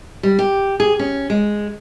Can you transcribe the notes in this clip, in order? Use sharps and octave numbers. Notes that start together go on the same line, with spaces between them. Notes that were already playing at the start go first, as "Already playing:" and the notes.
G3
G4
G#4
C#4
G#3